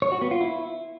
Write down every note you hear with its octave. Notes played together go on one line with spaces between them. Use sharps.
C#5
F#4
B3
F4
E4